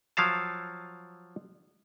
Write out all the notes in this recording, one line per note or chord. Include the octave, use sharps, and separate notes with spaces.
F3 F#3 F5 A5